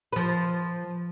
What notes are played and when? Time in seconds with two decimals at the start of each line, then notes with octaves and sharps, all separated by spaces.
0.13 F3 B4